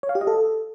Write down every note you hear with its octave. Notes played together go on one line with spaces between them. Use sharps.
C#5
F5
G4
D#5
A4